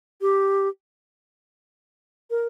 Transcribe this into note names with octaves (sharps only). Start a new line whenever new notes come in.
G4
A#4